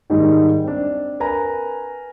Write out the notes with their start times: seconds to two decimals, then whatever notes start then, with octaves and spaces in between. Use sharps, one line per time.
0.10 G#2 D#3 G3 D#4
0.64 C4 D4
1.20 A#4 B4 G#5 A#5